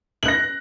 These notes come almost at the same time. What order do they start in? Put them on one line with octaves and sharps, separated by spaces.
F#7 F#6 A#6